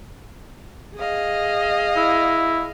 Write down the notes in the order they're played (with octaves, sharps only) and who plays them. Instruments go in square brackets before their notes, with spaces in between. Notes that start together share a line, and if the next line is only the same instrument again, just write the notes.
[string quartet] G#4 D#5 F5
[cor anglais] E4